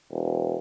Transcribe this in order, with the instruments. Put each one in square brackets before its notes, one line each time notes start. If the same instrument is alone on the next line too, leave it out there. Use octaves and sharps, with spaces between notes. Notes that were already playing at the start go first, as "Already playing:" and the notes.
[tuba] E1